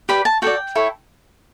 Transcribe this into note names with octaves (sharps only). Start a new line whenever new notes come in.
G4 B4 D5 B5
A5
F#4 A4 D5 G5
E4 A4 C#5